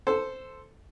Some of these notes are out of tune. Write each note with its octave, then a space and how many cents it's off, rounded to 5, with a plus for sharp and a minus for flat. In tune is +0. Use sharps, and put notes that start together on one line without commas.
A4 +0 C5 -5